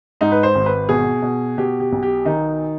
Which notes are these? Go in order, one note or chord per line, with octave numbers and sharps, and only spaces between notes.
G#2 D#4
B4
C5
G#1
B4
B2 G#4
B2
B2 G4
G4
B1
G4
D#3 D#4